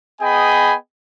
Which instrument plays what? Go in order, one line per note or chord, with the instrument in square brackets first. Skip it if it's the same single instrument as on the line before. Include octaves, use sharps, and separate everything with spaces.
[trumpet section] B3 G#4 D#5 G5 G#5 B5